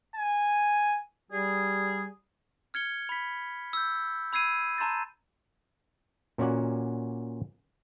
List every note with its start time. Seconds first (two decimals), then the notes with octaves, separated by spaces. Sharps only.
0.16 G#5
1.31 G3 G#4
2.74 F6 G#6 C#7 G7
3.09 B5 B6
3.73 E6 G6
4.33 B5 E6 G#6 C7 D#7
4.78 A5 A#5 C6 G6 A6
6.38 A#2 C#4 F#4 D5 F#5